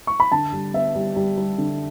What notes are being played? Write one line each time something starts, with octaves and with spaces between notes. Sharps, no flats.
C#6
B5
D3 A5
G3
B3 E5
G3
G3
G3
D3